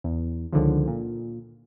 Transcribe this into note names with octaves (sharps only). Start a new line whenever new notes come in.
E2
C#2 D3 D#3 F3
A#2